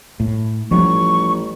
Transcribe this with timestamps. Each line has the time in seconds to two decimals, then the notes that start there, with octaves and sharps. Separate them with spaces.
0.20 A2
0.71 A1 F3 G3 C#6